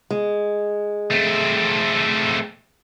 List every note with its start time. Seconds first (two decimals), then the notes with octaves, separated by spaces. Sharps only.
0.11 G#3
1.11 A3 C4